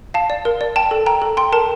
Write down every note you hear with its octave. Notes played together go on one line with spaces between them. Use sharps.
F5 A5
D5
A#4
D5
G5 A5
A4
G5 A#5
A4
G5 C6
A#4 A5